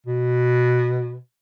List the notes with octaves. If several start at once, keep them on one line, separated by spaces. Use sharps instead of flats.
B2